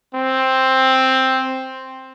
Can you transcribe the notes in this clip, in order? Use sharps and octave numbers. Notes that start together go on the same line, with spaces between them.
C4